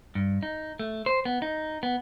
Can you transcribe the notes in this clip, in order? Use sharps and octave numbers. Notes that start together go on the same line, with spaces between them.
G2
D#4
A3
C5
B3
D#4
B3